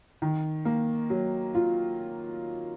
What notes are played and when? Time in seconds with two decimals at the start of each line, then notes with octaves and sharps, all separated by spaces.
0.22 D#3
0.65 A#3
1.10 F#3
1.55 F4